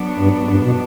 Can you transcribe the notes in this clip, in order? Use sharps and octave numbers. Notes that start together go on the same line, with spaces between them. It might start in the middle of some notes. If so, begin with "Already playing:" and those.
Already playing: F#3 B3 D4
G2
G2
B2